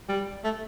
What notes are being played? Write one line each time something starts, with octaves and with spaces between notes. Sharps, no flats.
G3
A3